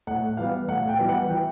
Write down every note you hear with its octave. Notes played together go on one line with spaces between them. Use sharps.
A2 F#5
E3 G3 B3 F5
A2 F#5
G5
E3 G3 B3
F#5
E3 G5